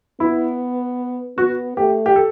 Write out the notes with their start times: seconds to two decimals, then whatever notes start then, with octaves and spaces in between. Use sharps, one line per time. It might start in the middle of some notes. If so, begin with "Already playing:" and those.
0.20 B3 E4
1.38 B3 F#4
1.77 A3 G4
2.06 G4
2.16 A4